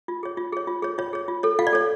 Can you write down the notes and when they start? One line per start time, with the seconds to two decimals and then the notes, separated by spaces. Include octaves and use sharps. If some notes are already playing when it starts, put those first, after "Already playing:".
0.08 F4
0.23 G#4 C#5
0.37 F4
0.52 G#4 C#5
0.67 F4
0.82 G#4 C#5
0.98 F4 C#5
1.13 G#4 C#5
1.28 F4
1.43 A4 C#5
1.59 F4 F5
1.67 D5
1.73 A4 C#5